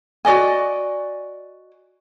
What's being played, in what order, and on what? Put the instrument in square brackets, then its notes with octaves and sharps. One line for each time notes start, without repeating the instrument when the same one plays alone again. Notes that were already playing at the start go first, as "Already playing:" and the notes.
[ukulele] F#4 D5 D#5 G#5